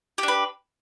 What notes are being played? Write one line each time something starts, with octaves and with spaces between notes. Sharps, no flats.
D4 G4 B4